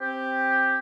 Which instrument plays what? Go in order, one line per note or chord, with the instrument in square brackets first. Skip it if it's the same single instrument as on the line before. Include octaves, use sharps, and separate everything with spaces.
[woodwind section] C4 G4